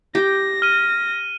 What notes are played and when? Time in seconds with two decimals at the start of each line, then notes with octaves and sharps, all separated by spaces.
0.15 G4 A#6
0.62 F6 D#7